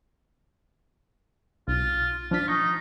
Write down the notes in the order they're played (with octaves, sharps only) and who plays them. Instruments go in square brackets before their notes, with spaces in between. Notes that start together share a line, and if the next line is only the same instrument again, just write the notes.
[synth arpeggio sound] B1 [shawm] F4
[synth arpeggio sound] F3 D4 B6 [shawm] F4
[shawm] D#4 [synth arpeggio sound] C#6